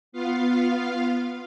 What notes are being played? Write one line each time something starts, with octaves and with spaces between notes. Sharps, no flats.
B3 F4 F5